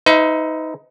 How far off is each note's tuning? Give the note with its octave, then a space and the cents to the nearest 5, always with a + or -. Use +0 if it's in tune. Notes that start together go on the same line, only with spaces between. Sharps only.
D#4 +20 B4 +45 E5 +5